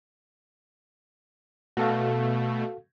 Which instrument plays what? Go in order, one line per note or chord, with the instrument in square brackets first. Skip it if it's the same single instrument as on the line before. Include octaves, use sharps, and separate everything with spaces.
[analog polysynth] B2 A3 [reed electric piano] F#4 A4 F5